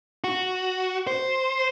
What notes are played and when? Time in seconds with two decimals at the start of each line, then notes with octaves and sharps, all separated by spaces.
0.24 F#4
1.07 C5